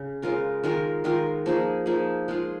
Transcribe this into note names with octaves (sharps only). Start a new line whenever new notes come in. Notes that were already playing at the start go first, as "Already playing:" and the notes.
Already playing: C#3
C#3 G#3 F4 A#4
D#3 G#3 F4 A#4
D#3 G#3 F4 A#4
F3 A#3 D#4 G#4
F3 A#3 D#4 G#4
G#3 F4 G#4